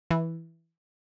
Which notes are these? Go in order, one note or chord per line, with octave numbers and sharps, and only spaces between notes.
E3